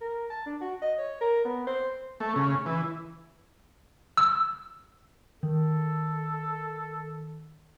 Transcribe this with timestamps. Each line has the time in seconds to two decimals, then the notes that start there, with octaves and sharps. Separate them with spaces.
0.01 A#4
0.30 A5
0.46 D4
0.61 F#4
0.82 D#5
0.98 C#5
1.21 A#4
1.45 B3
1.67 C5
2.20 A3
2.36 C#3
2.66 E3
4.17 E6
5.43 D#3 A4